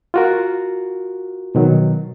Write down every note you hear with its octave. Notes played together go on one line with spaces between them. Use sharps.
F4 F#4 A#4
B2 D#3 F#3